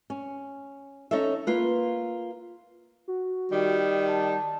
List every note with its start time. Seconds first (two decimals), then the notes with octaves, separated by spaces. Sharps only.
0.10 C#4
1.11 C#4 D#4 A4 C#5 E5
1.47 A#3 F4 B4
3.08 F#4
3.51 D#3 G3
4.08 A5